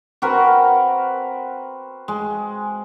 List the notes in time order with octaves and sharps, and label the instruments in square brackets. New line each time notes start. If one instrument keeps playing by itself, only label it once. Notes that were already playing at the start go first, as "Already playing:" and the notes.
[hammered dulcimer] C4 F#4 A#4 B4
G#3